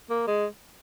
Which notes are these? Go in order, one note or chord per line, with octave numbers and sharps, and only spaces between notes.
A#3
G#3